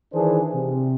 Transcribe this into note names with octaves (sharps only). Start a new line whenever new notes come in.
D#3 E3 D4 G#4 C5
C3